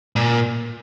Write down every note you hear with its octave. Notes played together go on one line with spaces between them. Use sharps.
A#2